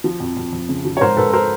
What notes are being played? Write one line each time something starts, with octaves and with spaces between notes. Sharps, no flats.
F3
F2
F2
F2
C#3
F3
C#5
G#2 A#4 C5
G#2 A4 B4
A#4 C5